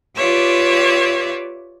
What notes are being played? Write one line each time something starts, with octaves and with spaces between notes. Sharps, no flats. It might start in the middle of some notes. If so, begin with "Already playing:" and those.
F4 G4 B4 C#5 D5 E5